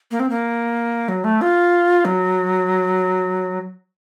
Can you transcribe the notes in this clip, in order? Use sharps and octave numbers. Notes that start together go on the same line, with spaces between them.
A#3
C4
A#3
F#3
A3
F4
F#3